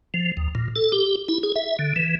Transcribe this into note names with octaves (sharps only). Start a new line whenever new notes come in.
F3
D#2
A#2
A4
G4
E4
G#4
E5
D3
E3